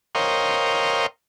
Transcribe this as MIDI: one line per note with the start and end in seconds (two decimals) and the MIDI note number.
0.15 1.06 70
0.15 1.06 72
0.15 1.06 73
0.15 1.06 75
0.15 1.06 77
0.15 1.06 79